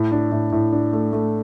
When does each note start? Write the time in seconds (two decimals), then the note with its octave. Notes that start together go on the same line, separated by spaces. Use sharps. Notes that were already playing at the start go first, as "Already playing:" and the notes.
Already playing: A2
0.12 D4
0.32 A2
0.52 A2
0.73 D4
0.93 A3
1.13 A3